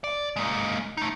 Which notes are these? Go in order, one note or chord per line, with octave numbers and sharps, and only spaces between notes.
D5
G#3 A#3
A3 D#4